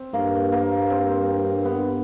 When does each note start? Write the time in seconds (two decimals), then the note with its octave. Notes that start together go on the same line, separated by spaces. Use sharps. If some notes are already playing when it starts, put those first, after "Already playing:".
Already playing: C4
0.13 G2 A#3
0.52 A#3
0.90 C4
1.65 B3